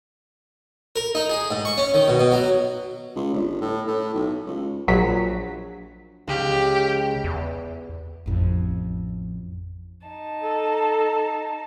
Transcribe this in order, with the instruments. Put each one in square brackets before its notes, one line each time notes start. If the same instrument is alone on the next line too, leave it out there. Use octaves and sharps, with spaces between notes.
[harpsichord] A#4
D#4
G#4
G#2
C#6
C#4
D#3
B2
B2
F#3
[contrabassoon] C#2
G1
A2
A2
B1
C#2
[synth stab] A#1 F#3 B6
[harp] C#2 [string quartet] G4
[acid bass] E2
[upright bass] A1 F2
[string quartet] D#4 A5
[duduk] A4